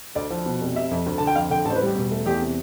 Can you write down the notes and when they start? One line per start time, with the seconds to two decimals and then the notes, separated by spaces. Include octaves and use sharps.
0.15 D2 D5
0.30 F3
0.46 B2
0.61 F1
0.75 C3 E5
0.91 F2
1.06 D2
1.18 D3 A5
1.27 G5
1.36 F2 F5
1.50 D3 G5
1.65 A1 A5
1.70 C5
1.76 B4
1.81 G3
1.86 G4
1.95 E1
2.11 A3
2.26 E2 G4
2.41 C3